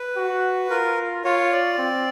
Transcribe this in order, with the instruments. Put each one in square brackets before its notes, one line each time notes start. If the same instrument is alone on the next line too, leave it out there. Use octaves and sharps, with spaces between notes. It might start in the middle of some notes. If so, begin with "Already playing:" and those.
Already playing: [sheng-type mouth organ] B4
[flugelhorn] F#4
[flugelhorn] F4 [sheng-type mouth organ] A#4
[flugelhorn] F4 [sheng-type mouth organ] C#5
[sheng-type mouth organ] D5
[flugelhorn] C4